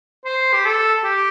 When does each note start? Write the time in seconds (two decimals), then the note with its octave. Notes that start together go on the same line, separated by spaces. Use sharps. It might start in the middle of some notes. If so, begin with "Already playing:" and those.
0.25 C5
0.53 G4
0.65 A4
1.04 G4